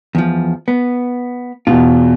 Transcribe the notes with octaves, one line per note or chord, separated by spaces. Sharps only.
E2 F3
B3
E2 B2 F4